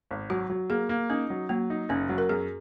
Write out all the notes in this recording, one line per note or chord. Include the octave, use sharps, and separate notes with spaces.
G#1
F#3 F#4
F#3
A#3 G#4
A#3
C#4 D#4
F#3
F#3 A#3
D#4
F#1 C#4
F#3
A#4
F#2 G#4